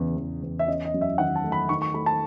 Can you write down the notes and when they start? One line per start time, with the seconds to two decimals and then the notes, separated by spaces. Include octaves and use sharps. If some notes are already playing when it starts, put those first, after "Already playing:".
Already playing: E2 C#3
0.17 E2
0.43 E2
0.59 E5
0.68 C#4 D#5
0.85 D#5
0.94 F#2
1.01 E5
1.18 D#3 F#5
1.36 A5
1.44 A3
1.52 B5
1.69 D#3 C#6
1.82 C#6
1.94 A3 B5
2.06 A5